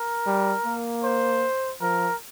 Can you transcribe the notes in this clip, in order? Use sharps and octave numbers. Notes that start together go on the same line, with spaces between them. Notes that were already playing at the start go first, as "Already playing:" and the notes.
Already playing: A#4
G3
A#3
C5
F3 A#4